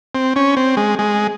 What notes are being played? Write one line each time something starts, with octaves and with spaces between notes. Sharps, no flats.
C4
C#4
C4
G#3
G#3